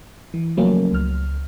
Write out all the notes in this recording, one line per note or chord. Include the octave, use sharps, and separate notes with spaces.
E3
C#3 F3 F#3 A3 A#3 C#4
C#2 F6